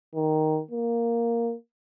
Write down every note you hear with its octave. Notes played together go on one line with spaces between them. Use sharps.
D#3
A#3